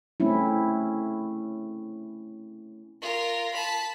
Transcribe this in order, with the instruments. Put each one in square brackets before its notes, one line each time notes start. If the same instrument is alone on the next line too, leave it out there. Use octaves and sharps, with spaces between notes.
[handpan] A3 C4 C#4 E4
[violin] F4 A#4
A5 B5